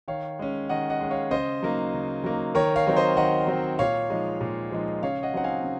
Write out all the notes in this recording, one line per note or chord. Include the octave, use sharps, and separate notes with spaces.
D#3 C#5 F5
G#3 C#4
D#3 D#5 F#5
D#5 F#5
G#3 C#4
C#5 F5
C#3 C5 D#5
F#3 A#3 D#4
C#3
F#3 A#3 D#4
D#3 A#4 C#5
C#5 F5
F#3 C4 D#4
C5 D#5
D#3 D#5 F#5
F#3 C4 D#4
A#2 C#5 F5
F3 G#3 D#4
A#2
F3 G#3 D#4
C#3 C#5 F5
D#5 F#5
F#3 C4 D#4 F#5
F5 G#5
C#3